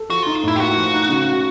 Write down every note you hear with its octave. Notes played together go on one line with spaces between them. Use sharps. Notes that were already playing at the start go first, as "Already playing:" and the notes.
Already playing: A4
F3 F#4
D#4 F4
A2 E4
G4
A#3 F#4
F3
D#4
C#3